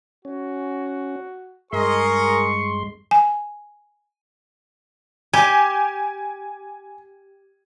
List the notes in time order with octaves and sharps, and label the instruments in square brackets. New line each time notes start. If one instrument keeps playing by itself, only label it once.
[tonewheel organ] C#4 [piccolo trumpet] F#4
[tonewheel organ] G2 G#3 C6 [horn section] G#4 A#4 D#5 [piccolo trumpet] C#6
[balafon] G#5
[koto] G4 [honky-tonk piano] G#5